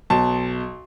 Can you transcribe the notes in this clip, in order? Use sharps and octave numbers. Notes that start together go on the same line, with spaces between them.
B1 A5